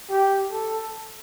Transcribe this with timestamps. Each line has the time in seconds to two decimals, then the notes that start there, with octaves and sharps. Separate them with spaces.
0.10 G4
0.52 A4